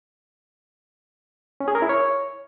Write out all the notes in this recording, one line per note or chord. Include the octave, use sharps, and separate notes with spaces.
C#4
G#4
A#4
E4
C#5